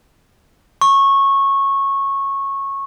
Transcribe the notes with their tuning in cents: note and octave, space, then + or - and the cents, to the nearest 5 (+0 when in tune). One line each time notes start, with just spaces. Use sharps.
C#6 -15